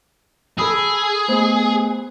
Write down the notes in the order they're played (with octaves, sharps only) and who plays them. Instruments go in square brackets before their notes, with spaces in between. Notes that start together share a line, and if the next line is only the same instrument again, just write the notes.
[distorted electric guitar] G#4 [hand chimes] A4 B5 E6
[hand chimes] A3 B3 C5